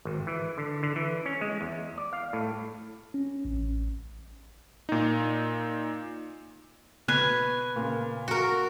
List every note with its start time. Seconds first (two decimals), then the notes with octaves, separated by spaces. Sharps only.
0.05 G#1
0.27 E3
0.58 D3
0.83 D3
0.96 E3
1.26 C#4
1.41 G#3
1.61 E2
1.98 D5
2.13 F5
2.33 A2
3.14 C#4
3.45 A1
4.89 A#2 D#4
7.08 B2 B4 G#5
7.76 A#2 C#3
8.28 F#4 A#4